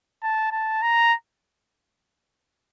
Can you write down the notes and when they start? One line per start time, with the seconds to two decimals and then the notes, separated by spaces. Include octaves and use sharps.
0.23 A5
0.52 A5
0.82 A#5